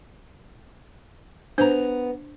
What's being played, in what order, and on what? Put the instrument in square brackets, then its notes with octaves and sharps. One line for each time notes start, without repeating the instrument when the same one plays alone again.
[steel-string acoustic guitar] B3 A#5 [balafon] D4 C5